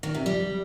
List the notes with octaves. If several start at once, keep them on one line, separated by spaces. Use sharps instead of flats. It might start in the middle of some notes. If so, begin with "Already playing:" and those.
D#3
C3
G3